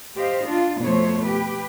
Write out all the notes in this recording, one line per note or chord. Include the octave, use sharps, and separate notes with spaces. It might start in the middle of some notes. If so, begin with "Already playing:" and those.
G4 C5 D#5 F5
D4 F4
F2 B2 A3 C5 C#5
G4 B4